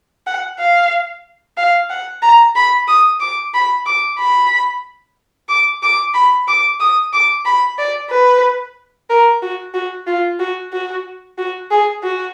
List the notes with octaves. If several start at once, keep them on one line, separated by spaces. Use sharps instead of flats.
F#5
F5
F5
F#5
A#5
B5
D#6
D6
B5
D6
B5
D6
D6
B5
D6
D#6
D6
B5
D5
B4
A#4
F#4
F#4
F4
F#4
F#4
F#4
G#4
F#4